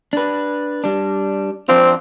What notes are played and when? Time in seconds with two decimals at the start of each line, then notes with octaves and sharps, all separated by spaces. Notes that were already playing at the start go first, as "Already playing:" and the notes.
0.13 D4 B4
0.84 G3 D4
1.69 F2 C4 D4 F4